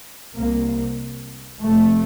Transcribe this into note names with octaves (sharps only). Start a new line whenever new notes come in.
C2 C3 A#3
F1 F2 C3 A3